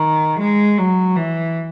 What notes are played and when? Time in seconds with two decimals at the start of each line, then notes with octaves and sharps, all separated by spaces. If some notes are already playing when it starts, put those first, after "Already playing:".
Already playing: D#3
0.40 G#3
0.78 F#3
1.16 E3